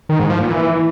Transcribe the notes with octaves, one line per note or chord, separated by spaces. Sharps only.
D#3
G#2
F3
A#2
E3